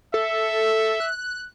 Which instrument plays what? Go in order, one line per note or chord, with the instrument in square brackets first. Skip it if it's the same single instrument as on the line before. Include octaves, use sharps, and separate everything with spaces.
[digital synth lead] A4 [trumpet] E5
[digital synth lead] F#6